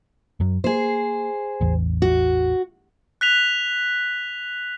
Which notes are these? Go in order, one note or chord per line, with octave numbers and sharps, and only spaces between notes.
F#2 F#3
A#3 G#4 C5
A1 E2
F#4
F#6 B6 F7